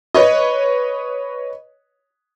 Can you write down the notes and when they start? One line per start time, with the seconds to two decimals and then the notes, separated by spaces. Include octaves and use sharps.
0.14 B4 C#5 D#5